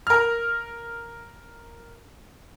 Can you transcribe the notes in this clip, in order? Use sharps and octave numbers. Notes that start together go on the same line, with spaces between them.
A#4 F6